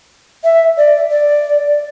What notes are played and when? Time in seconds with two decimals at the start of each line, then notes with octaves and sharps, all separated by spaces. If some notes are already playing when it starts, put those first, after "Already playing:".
0.44 E5
0.77 D5
1.11 D5